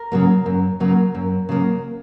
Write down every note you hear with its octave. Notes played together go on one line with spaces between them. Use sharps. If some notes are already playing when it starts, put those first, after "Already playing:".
Already playing: A#4
C#3 F#3 A#3
F#2
C#3 F#3 A#3
F#2
C#3 F#3 A#3